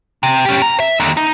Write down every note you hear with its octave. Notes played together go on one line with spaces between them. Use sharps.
C3
C#4 G4
A#5
E5
D#2 D3
D#4